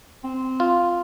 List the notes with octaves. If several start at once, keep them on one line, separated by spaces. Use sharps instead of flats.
C4
F4